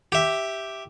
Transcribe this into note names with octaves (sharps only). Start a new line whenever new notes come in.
G4 E5